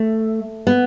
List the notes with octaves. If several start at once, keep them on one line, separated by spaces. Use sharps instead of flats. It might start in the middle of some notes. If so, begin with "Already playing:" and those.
Already playing: A3
B3